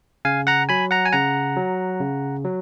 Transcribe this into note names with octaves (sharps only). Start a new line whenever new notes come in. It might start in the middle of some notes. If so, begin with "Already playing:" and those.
C#3 F5 G#5
F#5 A#5
F#3 G#5 B5
F#5 A#5
G#5
C#3 F#5 A#5
F#3
C#3
F#3